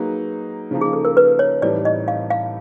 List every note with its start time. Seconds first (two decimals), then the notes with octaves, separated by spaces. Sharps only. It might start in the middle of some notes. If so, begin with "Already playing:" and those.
Already playing: F#3 A#3 D#4 G#4 B4
0.71 C#3 F3 A#3 D#4
0.81 G#4
0.93 A4
1.05 A#4
1.17 B4
1.39 C#5
1.62 A2 E3 G3 C4 D#4 D5
1.85 D#5
2.08 F5
2.30 F5